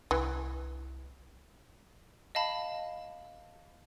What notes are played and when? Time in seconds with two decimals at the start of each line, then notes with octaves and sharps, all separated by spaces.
0.11 C2 E3
2.35 D#5 F5 A5 B5